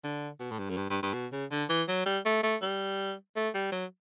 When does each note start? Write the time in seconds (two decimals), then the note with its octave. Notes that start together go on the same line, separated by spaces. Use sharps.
0.04 D3
0.40 B2
0.51 A2
0.59 G2
0.70 F#2
0.77 G2
0.90 G2
1.02 G2
1.14 B2
1.32 C#3
1.51 D3
1.69 E3
1.88 F#3
2.06 G3
2.25 A3
2.43 A3
2.62 G3
3.36 A3
3.54 G3
3.72 F#3